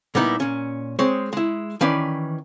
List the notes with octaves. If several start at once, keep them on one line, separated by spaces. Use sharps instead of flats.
A#2 G3 B3 D#4 E4
A#2 C#4
G#3 C4 C#5
G#3 E4
D#3 E3 C#4 B4 D5